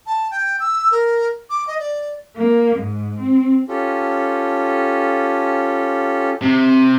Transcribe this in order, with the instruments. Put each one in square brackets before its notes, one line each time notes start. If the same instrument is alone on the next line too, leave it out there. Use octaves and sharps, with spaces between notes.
[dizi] A5
G5
E6
A#4
D6
D#5
D5
[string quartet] A#3
G#2
C4
[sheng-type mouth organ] C#4 F4 G4 A4
[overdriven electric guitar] C3